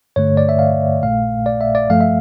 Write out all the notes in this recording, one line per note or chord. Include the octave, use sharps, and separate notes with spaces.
G2 D3 A3 C#5
D5
E5
F5
A#1 A#2 A3 F5
D5
E5
D5
G2 F3 A3 F5
E5